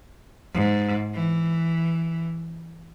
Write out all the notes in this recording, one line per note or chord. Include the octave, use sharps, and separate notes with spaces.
G#2
E3